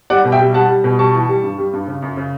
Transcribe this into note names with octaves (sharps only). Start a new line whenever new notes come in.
G3 D5 F#5
B2
E5 G5
G3
G3 F#5 A5
G3
B2
G3 A5 C#6
E3
G3
G2
G3
G2
C#3
F#2
C#3